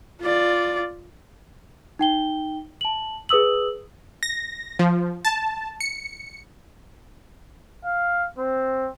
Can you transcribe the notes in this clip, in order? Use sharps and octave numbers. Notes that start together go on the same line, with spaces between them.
F4 D5
D#4 G5 G7
A5 F#7
G#4 B4 D#6 E6 F#7
A#6
F3
A5
C#7
F5
C4